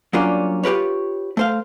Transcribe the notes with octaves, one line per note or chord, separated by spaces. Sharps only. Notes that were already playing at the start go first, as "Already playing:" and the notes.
F#3 G3 A#3 C#4 D4 F4
F4 G4 A#4 B4 C#5
A3 C5 F5